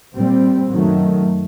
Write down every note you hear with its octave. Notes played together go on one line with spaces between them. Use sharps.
A#2 G3 C4
F#2 D#3 F#3 A3